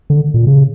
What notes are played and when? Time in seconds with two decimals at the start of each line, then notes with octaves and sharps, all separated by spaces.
0.10 D3
0.34 A#2
0.47 C#3